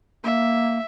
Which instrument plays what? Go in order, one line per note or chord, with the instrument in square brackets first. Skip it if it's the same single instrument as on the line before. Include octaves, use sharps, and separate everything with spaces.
[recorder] A#3 [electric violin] E5